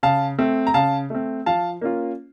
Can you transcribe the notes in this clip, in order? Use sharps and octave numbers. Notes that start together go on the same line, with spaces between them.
C#3 F5 A5
A3 C4
A#5
C#3 F5 A5
A3 C4
F3 F5 A5
A#3 C#4 F4